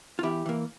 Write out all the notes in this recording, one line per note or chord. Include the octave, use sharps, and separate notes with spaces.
F4
E2 E4 G4
E3 A#3